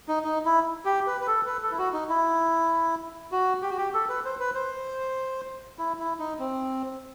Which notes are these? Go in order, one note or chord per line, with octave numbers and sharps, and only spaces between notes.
D#4
D#4
E4
G4
B4
B4
A4
B4
A4
E4
F#4
D#4
E4
F#4
G4
F#4
G4
A4
B4
C5
B4
C5
E4
E4
D#4
C4